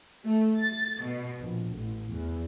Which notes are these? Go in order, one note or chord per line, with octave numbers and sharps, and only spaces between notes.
A3
A6
B2
A#1
A1
E2